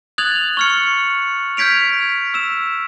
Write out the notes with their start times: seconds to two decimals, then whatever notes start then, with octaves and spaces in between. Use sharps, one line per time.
0.18 D#6 F#6 G#6 A6 F7 F#7
0.57 C#6 F6 C#7
1.57 F6 G6 G#6 B6 D7 F7
2.34 E6 E7